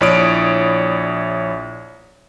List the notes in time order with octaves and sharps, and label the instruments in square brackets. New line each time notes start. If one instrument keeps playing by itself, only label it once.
[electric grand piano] A#1 E4 C#5 D5 D#6 D7